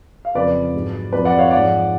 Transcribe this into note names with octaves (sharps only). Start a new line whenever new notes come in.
F5
F2 C#3 F3 B4 D5
G#2 F#3
F2 F3 B4 D5
D5 F#5
C#5 F5
G#2 F3 D5 F#5